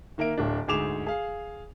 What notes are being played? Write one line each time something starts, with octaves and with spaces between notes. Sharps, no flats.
D#3 A#3 A#4 E5 D7
D1 D4
D2 G#2 G#4 D6 E7 F7
G#4 F5